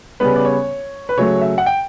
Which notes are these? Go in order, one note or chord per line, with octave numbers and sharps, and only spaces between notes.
C#3 G3 B3 B4
D5
C#5
B4
C#3 F#3 A3 C#5
E5
F#5
G5